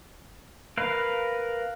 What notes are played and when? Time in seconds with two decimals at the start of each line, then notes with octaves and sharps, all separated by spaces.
0.77 A#4 B4 F5